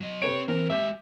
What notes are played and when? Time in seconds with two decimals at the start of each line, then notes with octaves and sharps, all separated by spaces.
0.01 F#3 D#5
0.22 C3 C4 B4 C#5 D7
0.48 E3 C4 A#4
0.70 G#3 G4 E5 D6 G6